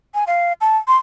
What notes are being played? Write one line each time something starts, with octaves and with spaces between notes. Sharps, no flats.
G#5
F5
A5
C6